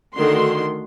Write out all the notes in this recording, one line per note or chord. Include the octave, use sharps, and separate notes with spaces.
D3 D#3 A3 F#4 C6